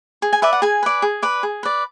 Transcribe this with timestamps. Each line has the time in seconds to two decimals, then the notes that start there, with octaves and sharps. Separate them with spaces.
0.22 G#4
0.33 G#5
0.42 B4 D5 E5
0.53 F#5
0.62 G#4 G#5
0.83 B4 D5
1.02 G#4
1.22 B4 D5
1.43 G#4
1.63 B4 D5